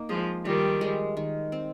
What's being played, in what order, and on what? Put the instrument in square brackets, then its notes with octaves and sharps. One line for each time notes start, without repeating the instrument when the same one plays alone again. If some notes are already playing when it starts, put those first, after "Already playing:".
Already playing: [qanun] A#3 D#4
[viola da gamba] F3 G#3 [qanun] G#4
[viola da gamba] D#3 G3 [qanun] F4
[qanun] G#3
D#3
C4